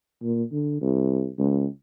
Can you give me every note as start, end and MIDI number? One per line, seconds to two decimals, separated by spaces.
0.23 0.43 46
0.52 0.78 50
0.81 1.29 36
1.39 1.66 37